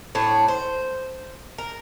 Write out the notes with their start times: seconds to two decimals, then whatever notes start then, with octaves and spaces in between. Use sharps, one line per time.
0.15 A2 D4 C#5
0.48 C5
1.58 A#4